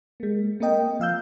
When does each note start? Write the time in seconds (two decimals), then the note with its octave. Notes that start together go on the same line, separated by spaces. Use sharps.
0.20 G#3 A#3
0.60 A#3 C4 A#4 D#5 G5
1.00 F3 F5 E6 G6